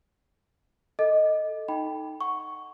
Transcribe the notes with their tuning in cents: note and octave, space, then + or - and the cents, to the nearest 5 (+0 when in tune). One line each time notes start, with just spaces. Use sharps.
A4 +0 D#5 +0 D6 +10
D#4 +0 G5 +0 B5 +0
F#5 +0 C#6 +0